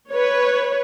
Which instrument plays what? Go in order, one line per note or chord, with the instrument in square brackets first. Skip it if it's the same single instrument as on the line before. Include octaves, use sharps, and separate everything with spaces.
[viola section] B4 C#5